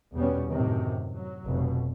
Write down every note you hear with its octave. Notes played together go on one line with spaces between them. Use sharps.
E2 B2 G3 B3 C#4
F#2 A2 C3 D#3
F#3
F1 B2